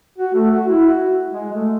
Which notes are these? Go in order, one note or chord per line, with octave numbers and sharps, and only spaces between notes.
F#4
A3
F#4
E4
F#4
G#3
A3